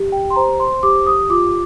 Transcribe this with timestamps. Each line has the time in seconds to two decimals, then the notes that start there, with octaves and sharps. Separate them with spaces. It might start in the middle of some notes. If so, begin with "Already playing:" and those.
Already playing: G4
0.12 G5
0.30 C6
0.36 C5 A#5
0.60 C6
0.83 G4 D6
1.07 D#6
1.30 F4 D6